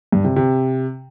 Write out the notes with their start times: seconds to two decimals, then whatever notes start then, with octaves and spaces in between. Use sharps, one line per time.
0.12 G2
0.24 C3
0.36 C3